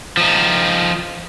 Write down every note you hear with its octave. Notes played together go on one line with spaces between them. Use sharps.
F3 D#4